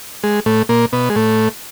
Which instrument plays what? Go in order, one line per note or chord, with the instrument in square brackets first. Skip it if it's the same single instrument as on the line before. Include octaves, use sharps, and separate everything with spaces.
[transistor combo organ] G#3
A2 A3
A#2 A#3
B2 B3
G#3
A2 A3